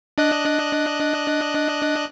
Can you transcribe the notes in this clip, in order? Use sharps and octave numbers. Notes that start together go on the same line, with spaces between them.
D4 D#5 F#6